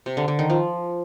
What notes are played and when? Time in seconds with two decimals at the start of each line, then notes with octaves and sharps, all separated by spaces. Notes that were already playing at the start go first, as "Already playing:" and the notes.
0.06 C3
0.17 D3
0.28 D3
0.39 D#3
0.50 F3